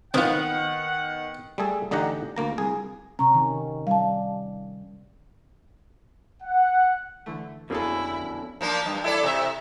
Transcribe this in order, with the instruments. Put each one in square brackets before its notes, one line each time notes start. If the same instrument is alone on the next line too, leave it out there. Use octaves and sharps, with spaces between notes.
[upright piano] D#3 [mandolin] B3 [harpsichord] C4 F4 [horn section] F#5
[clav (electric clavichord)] G3 A3 G#4 A4
A1 D3 D#4 G4 F#5 A#5
D2 A#3 A#5
C2 G#4
[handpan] C3 C#4 [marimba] A#5 C#6
[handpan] D#3
[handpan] G3 [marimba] F5 A5
[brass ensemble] F#5
[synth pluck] D3 E3 A3
[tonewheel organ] F2 [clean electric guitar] B2 D3 C#4 [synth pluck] A#3 G#4 A4 [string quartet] E4
[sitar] F3 A#3 D4
G2
E4 A4 D5
C3 E5